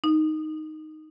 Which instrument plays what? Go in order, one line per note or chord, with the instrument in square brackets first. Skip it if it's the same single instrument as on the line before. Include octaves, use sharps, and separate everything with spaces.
[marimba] D#4